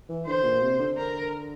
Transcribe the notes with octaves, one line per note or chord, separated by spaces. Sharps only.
E3
D3 C5
A#2
C3
D3
A#4